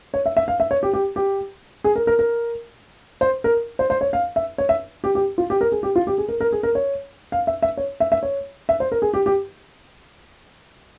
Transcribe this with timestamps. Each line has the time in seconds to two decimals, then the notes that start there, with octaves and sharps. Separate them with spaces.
0.14 C#5
0.26 E5
0.37 E5
0.48 F5
0.60 E5
0.71 C#5
0.83 G4
0.94 G4
1.16 G4
1.84 G#4
1.96 A#4
2.07 A#4
2.19 A#4
3.21 C5
3.44 A#4
3.79 C5
3.90 C5
4.01 C#5
4.13 F5
4.36 E5
4.58 C#5
4.69 E5
5.04 G4
5.15 G4
5.38 F4
5.50 G4
5.61 A#4
5.72 G#4
5.83 G4
5.96 F4
6.07 G4
6.18 G#4
6.29 A#4
6.41 A#4
6.53 G#4
6.63 A#4
6.75 C#5
7.32 F5
7.47 E5
7.62 E5
7.77 C#5
8.00 E5
8.12 E5
8.23 C#5
8.69 E5
8.80 C5
8.92 A#4
9.02 G#4
9.14 G4
9.26 G4